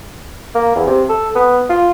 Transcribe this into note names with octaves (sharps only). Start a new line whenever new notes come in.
A#3
E2
C3
A4
B3
F4